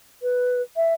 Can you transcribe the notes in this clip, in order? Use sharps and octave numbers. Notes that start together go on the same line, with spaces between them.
B4
E5